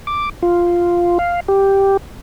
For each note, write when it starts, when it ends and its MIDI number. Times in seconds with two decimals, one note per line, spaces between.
0.07 0.29 86
0.43 1.18 65
1.19 1.40 77
1.48 1.97 67